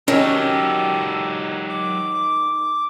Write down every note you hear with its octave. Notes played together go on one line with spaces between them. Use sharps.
D#3 F#3 C#4 G4 A4
D6